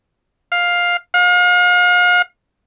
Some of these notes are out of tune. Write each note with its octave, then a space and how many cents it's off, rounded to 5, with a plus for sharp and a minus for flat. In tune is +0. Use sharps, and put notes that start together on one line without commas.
F5 +10
F5 +40